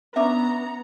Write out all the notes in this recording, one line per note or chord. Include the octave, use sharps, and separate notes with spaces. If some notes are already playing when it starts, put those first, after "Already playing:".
B3 C#4 D4 E5 A#5